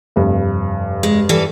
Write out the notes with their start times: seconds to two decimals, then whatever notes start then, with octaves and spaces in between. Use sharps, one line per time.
0.16 F1 G2
1.03 G#3
1.29 E3 G3 A4